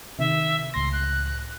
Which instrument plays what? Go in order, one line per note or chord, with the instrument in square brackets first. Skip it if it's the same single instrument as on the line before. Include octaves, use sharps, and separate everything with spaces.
[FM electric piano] C3 D#3 [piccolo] E5
[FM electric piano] C#2 A2 A#6 [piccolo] C6
[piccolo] F#6